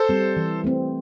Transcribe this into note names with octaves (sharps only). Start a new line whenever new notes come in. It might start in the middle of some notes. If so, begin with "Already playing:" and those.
Already playing: A4 C5
G3 C4
E3
A3 C4